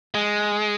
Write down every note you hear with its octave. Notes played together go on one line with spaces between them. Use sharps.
G#3